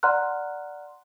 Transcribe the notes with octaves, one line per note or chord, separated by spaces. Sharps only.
D5 F#5 A#5 C6 F6 F#6